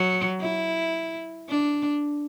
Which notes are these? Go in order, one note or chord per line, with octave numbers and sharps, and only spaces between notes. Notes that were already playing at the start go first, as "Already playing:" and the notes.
Already playing: F#3
E4
D4